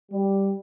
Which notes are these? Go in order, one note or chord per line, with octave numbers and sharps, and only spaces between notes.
G3